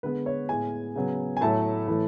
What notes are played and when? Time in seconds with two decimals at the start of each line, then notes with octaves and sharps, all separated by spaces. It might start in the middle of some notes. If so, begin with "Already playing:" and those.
0.03 D3 G#3 B3 B4
0.26 C#5
0.49 A2 G#3 B3 G#5
0.95 C#3 F#3 B3
1.37 G#5
1.41 A2 F#3 A3 A5
1.87 A2 E3 A3